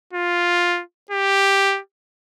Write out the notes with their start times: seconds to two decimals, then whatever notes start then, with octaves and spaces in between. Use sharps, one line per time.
0.13 F4
1.11 G4